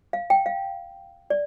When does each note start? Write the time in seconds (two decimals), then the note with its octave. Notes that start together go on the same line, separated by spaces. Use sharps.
0.13 F5
0.30 G5
0.46 F5
1.30 D5